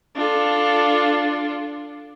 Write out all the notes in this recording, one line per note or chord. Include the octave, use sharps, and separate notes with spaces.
D4 F4 A4